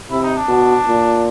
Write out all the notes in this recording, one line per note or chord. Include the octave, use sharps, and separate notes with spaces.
C3 E4
D#4
D4
B2
A#2